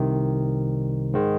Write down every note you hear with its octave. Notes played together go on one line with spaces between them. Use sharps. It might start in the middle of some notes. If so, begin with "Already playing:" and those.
Already playing: C2 C3 D#3
G#2 D#3 G#3